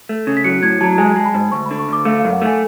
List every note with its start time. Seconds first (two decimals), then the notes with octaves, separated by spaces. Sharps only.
0.09 A3
0.27 C#3
0.37 B6
0.44 F#3 C#7
0.63 A2 G#6
0.81 F#3 A5
0.98 G#3 G#5
1.16 G#3 A5
1.25 B5
1.34 G#2
1.52 D2 C#6
1.66 B5
1.71 D3
1.79 C#6
1.89 D2 D6
2.05 A3 F5
2.19 F#2 F5
2.33 F#5
2.42 A3 G#5